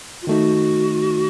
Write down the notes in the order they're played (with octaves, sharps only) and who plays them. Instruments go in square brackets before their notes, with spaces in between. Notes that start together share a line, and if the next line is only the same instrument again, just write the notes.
[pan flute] F4
[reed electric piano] D#3 A3 D#4 [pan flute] F#4